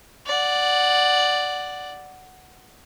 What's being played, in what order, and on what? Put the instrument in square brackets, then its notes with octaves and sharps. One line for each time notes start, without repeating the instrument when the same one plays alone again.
[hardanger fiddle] D5 F#5